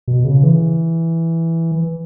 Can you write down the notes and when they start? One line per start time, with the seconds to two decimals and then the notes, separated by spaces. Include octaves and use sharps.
0.08 B2
0.25 C#3
0.43 E3